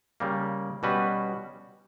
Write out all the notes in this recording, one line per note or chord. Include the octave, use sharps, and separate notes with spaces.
C#3 G3 A#3
B2 G3 C#4 F#4 B4